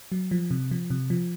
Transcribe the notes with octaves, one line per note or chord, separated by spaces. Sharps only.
F#3
F3
C3
F3
C3
F3